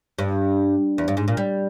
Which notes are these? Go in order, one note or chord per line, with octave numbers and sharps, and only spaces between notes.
G2
E2
G2
G#2
A#2
G3